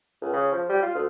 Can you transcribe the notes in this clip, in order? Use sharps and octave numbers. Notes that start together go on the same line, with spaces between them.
C#2
C#3
F3
G3
F4
D2